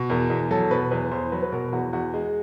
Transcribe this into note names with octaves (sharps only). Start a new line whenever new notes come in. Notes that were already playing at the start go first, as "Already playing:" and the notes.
Already playing: B2
E2 A#4
E2
F#3 A4
B2 B4
E2 B4
E2 C5
F#3 B4
B4
B2 A#4
E2 F#4
E2 F#4
G#3